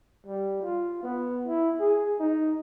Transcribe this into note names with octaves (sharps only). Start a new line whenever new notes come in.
G3
F4
B3
E4
G#4
D#4